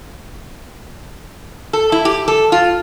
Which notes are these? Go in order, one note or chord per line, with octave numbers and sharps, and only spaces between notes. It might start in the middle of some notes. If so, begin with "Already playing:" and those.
A4
E4
G4
A4
F4